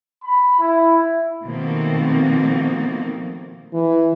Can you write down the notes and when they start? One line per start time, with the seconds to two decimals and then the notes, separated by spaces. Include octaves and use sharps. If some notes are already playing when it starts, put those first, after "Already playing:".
0.24 B5
0.59 E4
1.44 B2 D#3 F3 A3 A#3 C4
3.74 E3